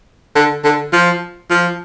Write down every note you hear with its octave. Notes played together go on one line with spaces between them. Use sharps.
D3
D3
F3
F3